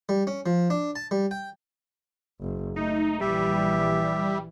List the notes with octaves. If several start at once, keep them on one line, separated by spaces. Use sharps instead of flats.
G3
C#4
F3
D4
A5
G3
G5
F#1
A3 D#4
A#1 E3 G3 G4 E5